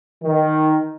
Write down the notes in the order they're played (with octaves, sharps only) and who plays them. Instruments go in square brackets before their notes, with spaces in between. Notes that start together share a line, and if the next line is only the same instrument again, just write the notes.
[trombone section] D#3